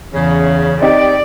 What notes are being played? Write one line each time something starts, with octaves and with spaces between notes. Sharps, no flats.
E2 C#3
C4 D#4 G4 D5